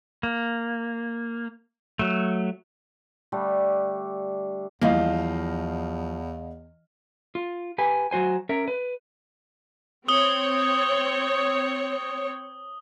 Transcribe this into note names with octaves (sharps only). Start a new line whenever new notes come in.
A#3
F#3 A3
D3 G3 A3 D4
E2 E3 F3 G3 A#3 D#5 F5
F4
G4 B4 G#5
F#3 F#4 C5 G#5
C#4 A#4 E5
B4
C4 C#5 D#6 G7